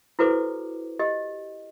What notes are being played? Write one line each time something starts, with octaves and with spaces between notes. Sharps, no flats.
E4 F#4 A4 B4 C5 D6
G4 D#5